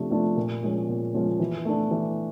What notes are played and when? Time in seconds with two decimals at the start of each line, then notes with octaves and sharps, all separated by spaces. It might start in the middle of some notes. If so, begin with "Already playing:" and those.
Already playing: C3 F3 A3 D4
0.11 F3 A3 D4
0.37 A#2
0.63 F3 G#3 C#4
0.89 A#2
1.14 F3 G#3 C#4
1.40 E3
1.65 A3 D4
1.91 E3